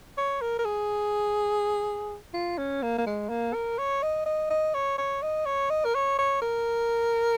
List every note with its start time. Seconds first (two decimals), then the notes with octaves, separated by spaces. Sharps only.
0.18 C#5
0.41 A#4
0.59 A#4
0.65 G#4
2.34 F4
2.58 C#4
2.82 A#3
2.98 A#3
3.06 G#3
3.29 A#3
3.54 A#4
3.78 C#5
4.03 D#5
4.26 D#5
4.50 D#5
4.74 C#5
4.98 C#5
5.22 D#5
5.46 C#5
5.70 D#5
5.85 A#4
5.95 C#5
6.19 C#5
6.42 A#4